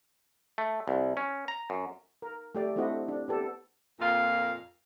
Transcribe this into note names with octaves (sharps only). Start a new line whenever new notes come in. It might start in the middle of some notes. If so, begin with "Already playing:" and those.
A3
C2
C#4
A#5
F#2
A#4
A3 G4 D5
A3 C4 D4 E4 F#4 D#5
D4
B3 G4 A4
F2 A#2 A#3 F5